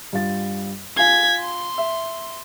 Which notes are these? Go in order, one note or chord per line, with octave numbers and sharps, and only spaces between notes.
G2 F4 A6
F4 G#5 G#6 B6 C7
C6
E5